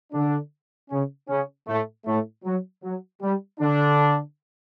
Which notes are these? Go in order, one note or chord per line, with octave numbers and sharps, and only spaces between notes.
D3 D4
C#3 C#4
C#3 C#4
A2 A3
A2 A3
F#3
F#3
G3
D3 D4